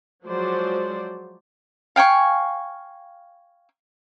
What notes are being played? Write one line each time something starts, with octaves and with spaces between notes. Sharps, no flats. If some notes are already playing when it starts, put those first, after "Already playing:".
F3 F#3 G#3 F#4 C5 D5
F5 G5 G#5 C#6